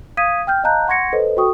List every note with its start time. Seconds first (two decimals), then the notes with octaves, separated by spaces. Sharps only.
0.17 F5 D#6 G#6 B6 D#7
0.47 G5 F6 G6
0.64 D#5 F5 A5 A#5 F#6 G6
0.88 F#5 C6 C#6 G#6 A#6 C#7
1.13 A4 B4 C5 D#5
1.37 F#4 A4 G5 C#6 D#6